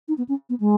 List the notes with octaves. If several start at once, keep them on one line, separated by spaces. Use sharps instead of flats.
D#4
B3
C#4
B3
G#3